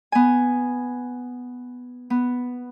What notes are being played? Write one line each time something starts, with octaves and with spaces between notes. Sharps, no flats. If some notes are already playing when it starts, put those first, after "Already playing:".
B3 G#5
B3